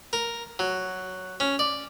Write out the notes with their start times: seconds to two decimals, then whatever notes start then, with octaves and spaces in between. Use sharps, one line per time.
0.13 A#4
0.59 F#3
1.40 C#4
1.59 D5